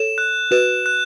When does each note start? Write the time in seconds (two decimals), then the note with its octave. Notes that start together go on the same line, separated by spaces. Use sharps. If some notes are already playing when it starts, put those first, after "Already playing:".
Already playing: A4 C#5 E7
0.18 F#6
0.51 F#4 B4 E7
0.86 F#6